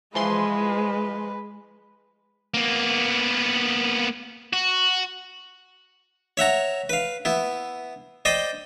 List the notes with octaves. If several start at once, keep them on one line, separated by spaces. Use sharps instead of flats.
E3 F3 G#3 B4 C6
A#3 B3
F#4
C#5 E5 F#5 A#5
B4 F5
B3 E4
C5 D5 D#5 G5